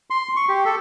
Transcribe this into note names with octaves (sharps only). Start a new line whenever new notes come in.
C6
C#6
G4
A4